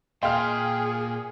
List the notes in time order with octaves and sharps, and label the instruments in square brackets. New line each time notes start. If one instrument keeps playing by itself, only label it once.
[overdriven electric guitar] A#2 [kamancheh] G#4 [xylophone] D#5 F5 C6 [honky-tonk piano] G5 F6